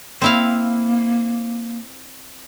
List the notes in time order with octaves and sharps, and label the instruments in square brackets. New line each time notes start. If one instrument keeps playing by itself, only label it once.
[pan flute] A#3 [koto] C4 E4 F5